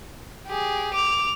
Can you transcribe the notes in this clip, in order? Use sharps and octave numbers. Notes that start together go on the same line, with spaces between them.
G4 G#4
D6 F7